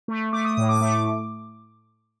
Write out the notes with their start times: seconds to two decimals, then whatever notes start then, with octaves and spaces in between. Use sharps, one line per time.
0.08 A3
0.33 A3 D6
0.45 D#6
0.57 A2 D#6
0.69 D6
0.81 A3